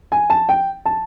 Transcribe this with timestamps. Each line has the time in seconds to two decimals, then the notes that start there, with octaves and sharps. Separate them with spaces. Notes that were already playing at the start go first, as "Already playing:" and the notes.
0.12 G#5
0.30 A5
0.49 G5
0.86 A5